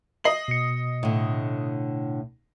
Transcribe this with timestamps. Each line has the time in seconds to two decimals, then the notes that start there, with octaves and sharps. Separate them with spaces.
0.24 D#5 C7 F#7
0.48 B2 C#7
1.03 A2 D3